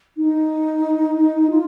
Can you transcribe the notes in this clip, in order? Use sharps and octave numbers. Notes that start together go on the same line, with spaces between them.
D#4
F4